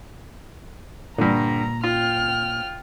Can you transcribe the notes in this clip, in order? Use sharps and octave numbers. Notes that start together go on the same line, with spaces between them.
G2 A#2 D3 A#5
F4 G5 F6